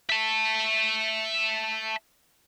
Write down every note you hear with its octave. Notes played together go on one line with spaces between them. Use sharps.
E5 A5